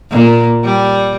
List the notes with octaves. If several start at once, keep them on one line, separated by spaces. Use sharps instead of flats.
A#2
G3